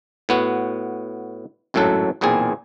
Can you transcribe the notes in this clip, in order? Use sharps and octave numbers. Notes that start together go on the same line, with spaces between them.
A2 B3 F#4
G#1 F#2 A2 F#3 A4 F#5
B1 E2 A#2 C4 G#4